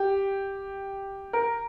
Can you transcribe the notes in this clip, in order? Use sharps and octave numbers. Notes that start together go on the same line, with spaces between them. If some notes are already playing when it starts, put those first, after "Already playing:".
Already playing: G4
A#4